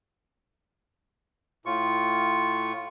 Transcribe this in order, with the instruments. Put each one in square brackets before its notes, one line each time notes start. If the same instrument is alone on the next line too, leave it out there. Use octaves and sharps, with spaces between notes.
[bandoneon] A2 F4 C#6